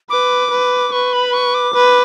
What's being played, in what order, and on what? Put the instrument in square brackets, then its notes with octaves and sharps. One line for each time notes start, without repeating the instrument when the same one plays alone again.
[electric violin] B4 [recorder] D6
[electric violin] B4
[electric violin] B4 [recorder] C#6
[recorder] B5
C#6
D6
[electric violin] B4